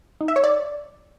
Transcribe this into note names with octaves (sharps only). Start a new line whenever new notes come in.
D#4
E5
C#5
D5